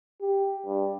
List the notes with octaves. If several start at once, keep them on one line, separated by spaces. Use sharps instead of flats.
G4
G2